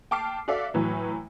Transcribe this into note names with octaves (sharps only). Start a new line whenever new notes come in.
G5 A5 D6 F6 C7
F#4 A4 D5 E5 F5
A2 E3 F#3